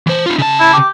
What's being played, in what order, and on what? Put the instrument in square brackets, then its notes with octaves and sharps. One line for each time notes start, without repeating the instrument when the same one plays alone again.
[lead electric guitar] E3 C5
D#4 F4
C#3 A5
[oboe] E4
G4